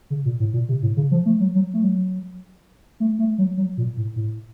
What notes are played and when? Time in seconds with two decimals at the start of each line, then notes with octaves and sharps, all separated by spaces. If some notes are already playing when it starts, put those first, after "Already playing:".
0.10 C#3
0.25 A#2
0.40 A2
0.53 A#2
0.69 C3
0.82 A2
0.97 C#3
1.11 F3
1.26 A3
1.40 F#3
1.55 F#3
1.74 A3
1.84 F#3
3.00 A3
3.19 A3
3.38 F#3
3.57 F#3
3.77 A#2
3.97 A2
4.16 A2